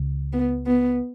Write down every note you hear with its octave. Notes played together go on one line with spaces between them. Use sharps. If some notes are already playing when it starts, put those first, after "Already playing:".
Already playing: C#2 C#3
B3
B3